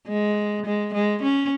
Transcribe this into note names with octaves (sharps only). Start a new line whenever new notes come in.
G#3
G#3
G#3
C#4